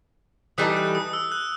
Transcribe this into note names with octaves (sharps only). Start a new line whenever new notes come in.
E3 G3 D#4 A4 D#6
F#6
D#6
E6
F#6